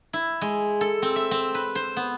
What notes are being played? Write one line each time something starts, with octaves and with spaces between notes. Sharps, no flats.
E4
G#3
A4
C4
E5
C4
B4
C5
B3